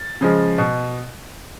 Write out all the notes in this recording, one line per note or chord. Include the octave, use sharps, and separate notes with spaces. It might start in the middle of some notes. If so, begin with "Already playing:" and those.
Already playing: A6
C#3 F3 G#3
B2